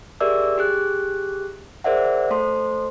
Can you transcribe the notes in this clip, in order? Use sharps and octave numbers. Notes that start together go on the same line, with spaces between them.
G4 G#4 A#4 D5 E5 E6
G4 G#4 F#6
G#4 A#4 C5 D5 E5 F#5
A3 A4 C5 C6